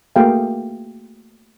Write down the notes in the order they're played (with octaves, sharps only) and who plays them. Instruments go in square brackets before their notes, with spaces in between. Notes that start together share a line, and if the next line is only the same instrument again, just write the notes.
[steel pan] A3 A#3 F#4 G#4 F5 G5